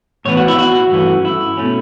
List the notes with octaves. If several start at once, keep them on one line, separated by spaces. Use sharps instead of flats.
A2 E3 B3 D4 C#5
F#4
E4
F#4
G2 E3 A3 C#4
E4
B2 A3 C#4